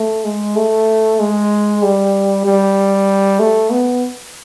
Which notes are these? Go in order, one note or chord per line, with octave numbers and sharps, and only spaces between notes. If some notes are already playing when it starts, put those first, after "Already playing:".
Already playing: A3
G#3
A3
G#3
G3
G3
A3
B3